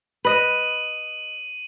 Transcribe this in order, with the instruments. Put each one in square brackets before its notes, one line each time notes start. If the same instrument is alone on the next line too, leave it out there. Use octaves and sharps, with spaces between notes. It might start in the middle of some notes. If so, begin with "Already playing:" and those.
[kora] B4 D#5 [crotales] D#7 F#7